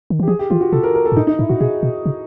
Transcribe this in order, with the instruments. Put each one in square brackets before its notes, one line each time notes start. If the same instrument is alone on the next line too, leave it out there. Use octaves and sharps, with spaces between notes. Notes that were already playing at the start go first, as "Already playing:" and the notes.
[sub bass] D#3
[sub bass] E3 [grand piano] G4
[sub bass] F3 [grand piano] G#4
[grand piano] G4
[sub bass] E3 [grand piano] F4
[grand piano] F#4
[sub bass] C3 [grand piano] A4
[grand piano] A#4
A#4
A4
[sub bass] G#2
[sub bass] A2 [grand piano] D#4
[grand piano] D#4
[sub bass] A2 [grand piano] E4
[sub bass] A#2 [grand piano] F#4
[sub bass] B2 [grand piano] G#4
[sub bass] B2
C#3